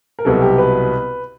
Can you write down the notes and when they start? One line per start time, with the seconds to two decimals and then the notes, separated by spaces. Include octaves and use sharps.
0.19 A#4
0.25 C2 B2 F#3 A4
0.42 G4
0.58 B4